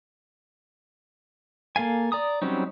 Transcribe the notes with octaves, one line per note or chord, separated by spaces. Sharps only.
A#3 A4 F5 G#5
D5 A#5 D#6
F#3 G3 C4 C#4 D#4